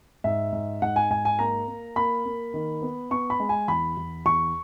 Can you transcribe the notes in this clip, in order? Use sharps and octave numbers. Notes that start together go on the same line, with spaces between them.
G#2 E5
G#2
G#2 F#5
G#5
G#2 G#5
G#5
A#3 A#5
A#3
A#3 B5
A#3
D#3
B3
B3 C#6
B5
G#3
G#5
E2 B5
E2
E2 C#6